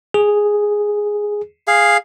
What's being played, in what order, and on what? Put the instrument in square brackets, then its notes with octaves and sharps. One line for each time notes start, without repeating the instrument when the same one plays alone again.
[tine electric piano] G#4
[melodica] G#4 F5